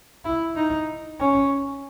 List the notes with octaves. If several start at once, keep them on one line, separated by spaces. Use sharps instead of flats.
E4
D#4
C#4